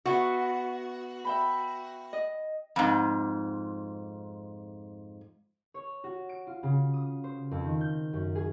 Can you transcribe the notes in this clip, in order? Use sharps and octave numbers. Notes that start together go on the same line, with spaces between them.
B3 F#4 E5
E5 G5 B5
D#5
F2 G#2
C#5
F#4
D7
F4
C#3
D#6
C5
F2
D#3
G6
F#2
G#4